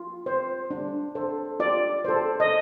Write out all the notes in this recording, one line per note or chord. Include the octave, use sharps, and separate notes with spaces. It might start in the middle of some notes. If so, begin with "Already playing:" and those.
Already playing: F4
C5
D4
A4 C5
F4 D5
A4 C5
D#5